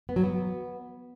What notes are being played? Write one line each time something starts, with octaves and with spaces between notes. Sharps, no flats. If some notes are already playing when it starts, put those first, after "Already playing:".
B3
F#3
B3